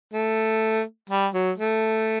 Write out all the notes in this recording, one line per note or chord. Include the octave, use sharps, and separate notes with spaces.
A3
G3
F#3
A3